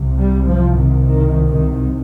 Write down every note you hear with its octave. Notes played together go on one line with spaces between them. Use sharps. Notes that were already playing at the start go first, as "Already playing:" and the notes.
Already playing: C2 C3
G3
F3
D#3
D#3
D#3